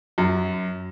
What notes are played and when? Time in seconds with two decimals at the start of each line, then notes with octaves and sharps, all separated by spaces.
0.18 F#2